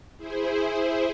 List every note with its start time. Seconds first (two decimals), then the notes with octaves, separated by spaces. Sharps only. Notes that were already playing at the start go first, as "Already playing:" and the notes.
0.18 E4 G#4 C5